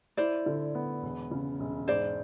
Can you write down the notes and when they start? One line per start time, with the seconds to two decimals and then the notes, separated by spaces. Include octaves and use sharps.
0.17 E4 C5 D5
0.46 D3
0.75 B3
1.03 E1
1.31 C#3
1.60 E1
1.88 G#2 C5 D5